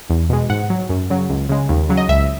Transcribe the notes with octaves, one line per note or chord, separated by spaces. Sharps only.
E2
B2 G#3
G#2 F#5
F#3
F#2
C#3 F#3
C#2
C#3 G#3
D#2
C#3 F#3
D#5
C#2 E5